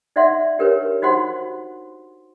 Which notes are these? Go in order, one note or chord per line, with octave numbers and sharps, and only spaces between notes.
D#4 D5 E5 F#5 C6
D4 G4 A#4 B4 C#5
D#4 F#4 C5 F#5 C6